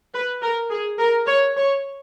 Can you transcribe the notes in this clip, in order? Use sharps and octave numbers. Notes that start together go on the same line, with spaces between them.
B4
A#4
G#4
A#4
C#5
C#5